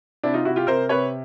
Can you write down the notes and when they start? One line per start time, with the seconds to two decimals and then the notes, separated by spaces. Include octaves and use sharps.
0.23 C3 D4 E4
0.34 D#4 F4
0.45 C3 E4 F#4
0.56 F4 G4
0.67 C3 A#4 C5
0.89 C3 B4 C#5